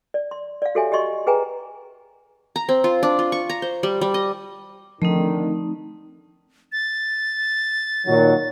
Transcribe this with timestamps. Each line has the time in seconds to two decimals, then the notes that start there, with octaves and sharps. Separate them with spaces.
0.14 D5
0.31 C6
0.62 D5 F5
0.75 F#4 G4 A4 C#5 E5 G#5
0.92 G4 D5 D#5 C6 C#6
1.27 G#4 B4 G5 G#5 A#5
2.56 A#5
2.69 C4
2.84 F4
3.03 D4
3.19 F4
3.32 C#6
3.49 A#5
3.62 C5
3.83 G3
4.01 G3
4.14 D#5
5.02 D3 D#3 F3 A3 C4 D#4
6.72 A6
8.07 A#2 D#3 F#3